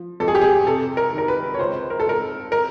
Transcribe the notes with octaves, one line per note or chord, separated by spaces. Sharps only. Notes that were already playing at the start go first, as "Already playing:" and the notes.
Already playing: F3
F2 A4
G#4
G4
G#4
C3 A4
A#4
D#3
A#4
B4
C#5
C#2 C5
A#4
A4
C#2 A#4
A#4